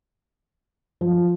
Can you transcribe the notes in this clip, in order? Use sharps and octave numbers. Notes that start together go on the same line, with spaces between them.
F3